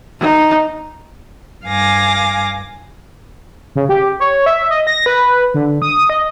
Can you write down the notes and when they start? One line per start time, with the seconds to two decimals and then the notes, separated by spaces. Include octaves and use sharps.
0.19 D#4
1.66 G2 F5 G#5 D6 A#6
3.75 C#3
3.89 G4
4.20 C#5
4.46 E5
4.70 D#5
4.87 A#6
5.06 B4
5.54 D3
5.82 D#6
6.10 D#5